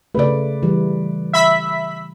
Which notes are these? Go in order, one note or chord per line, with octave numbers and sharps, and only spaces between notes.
C#3 A3 B4 D5
E3 G3
E5 B5 B6